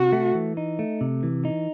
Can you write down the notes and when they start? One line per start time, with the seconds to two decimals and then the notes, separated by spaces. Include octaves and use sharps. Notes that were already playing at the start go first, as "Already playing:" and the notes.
Already playing: C3 F#4
0.13 A3
0.35 E3
0.57 D#4
0.79 A3
1.01 C3
1.23 E3
1.45 D#4